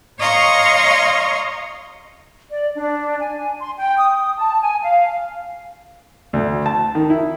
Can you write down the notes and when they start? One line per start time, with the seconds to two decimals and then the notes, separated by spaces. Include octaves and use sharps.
0.18 C#5 D#5 F5 A#5 C6 C#6
2.50 D5
2.75 D4
3.19 G#5
3.60 C6
3.78 G5
3.98 D#6
4.38 A5
4.61 G#5
4.82 F5
6.33 D2
6.66 A5
6.95 D#3
7.10 E4